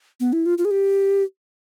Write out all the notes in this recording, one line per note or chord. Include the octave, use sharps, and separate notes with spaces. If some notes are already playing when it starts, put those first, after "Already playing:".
B3
E4
F4
F4
G#4
G4